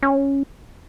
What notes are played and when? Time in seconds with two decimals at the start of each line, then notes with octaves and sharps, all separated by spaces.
0.03 C#4